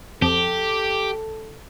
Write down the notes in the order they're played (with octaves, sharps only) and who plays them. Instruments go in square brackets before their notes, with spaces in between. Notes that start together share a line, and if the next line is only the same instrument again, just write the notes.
[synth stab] F2 [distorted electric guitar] G4 [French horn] A4